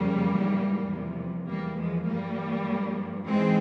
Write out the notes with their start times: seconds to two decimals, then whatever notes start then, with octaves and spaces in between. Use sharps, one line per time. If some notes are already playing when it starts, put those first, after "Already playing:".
Already playing: F2 C#3 F3 G3 A#3
0.31 G#2 E3
0.90 E2 C3 F3
1.50 E2 E3 G3 A#3
1.80 F3 G#3
2.09 G2 E3 G3 A#3
2.70 G2 F3
3.28 G#2 E3 G#3 C4